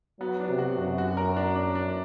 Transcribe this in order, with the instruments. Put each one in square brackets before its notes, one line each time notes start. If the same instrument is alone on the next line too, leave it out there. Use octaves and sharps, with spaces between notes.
[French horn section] F#3 [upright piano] B3
[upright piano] D4
[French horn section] C3
[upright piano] F#4
[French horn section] F#2 [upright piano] F#4
[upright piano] F#4
A#4
D4
D4
D4